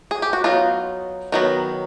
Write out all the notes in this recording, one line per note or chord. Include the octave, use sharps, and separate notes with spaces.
G#4
G4
F#4
F#3 B3 D#4 F4
D#3 F#3 B3